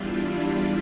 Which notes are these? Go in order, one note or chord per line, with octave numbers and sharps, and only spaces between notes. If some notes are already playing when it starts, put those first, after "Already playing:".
Already playing: E2 E3 G3 D4 F4